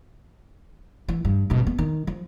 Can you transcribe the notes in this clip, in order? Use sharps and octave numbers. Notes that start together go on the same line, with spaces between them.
E3
G2
G#1 B2
B3
D#3
F3